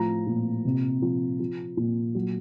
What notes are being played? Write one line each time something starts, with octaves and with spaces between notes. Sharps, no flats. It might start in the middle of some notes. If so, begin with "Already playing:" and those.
Already playing: A2 F3 A#5
A#2
C3
F3
F3
A#2
F#3